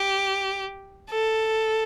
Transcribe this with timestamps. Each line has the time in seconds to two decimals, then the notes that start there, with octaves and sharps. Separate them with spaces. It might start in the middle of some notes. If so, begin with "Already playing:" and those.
Already playing: G4
1.09 A4